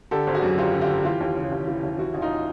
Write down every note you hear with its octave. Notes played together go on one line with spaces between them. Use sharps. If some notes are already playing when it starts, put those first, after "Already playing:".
D3 G4 A4
G#1
F#4 G#4
F#2
G#1 F4 G4
D3
F4 G4
G#1
E3 F4 G4
D#2
C#3
D#2
E3
D#2
E3 E4 F#4
A1
D#4 F4